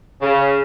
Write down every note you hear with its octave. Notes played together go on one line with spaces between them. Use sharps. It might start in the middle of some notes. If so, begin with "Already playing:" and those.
C#3